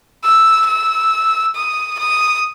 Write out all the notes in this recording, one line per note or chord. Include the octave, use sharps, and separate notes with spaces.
E6
E6
D#6
D#6